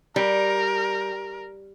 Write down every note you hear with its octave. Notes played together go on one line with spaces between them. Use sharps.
G3 A#4